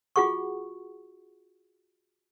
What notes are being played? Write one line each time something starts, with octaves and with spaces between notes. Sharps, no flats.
F4 F#4 G#4 F#5 C#6